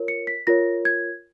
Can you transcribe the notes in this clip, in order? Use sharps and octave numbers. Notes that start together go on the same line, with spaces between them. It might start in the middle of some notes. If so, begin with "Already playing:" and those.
Already playing: F4 A#4 C#5
C#7
B6
F4 A#4 C#5 A#6
G#6